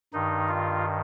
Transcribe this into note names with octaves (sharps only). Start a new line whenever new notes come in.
G2 D#3 D#4
F4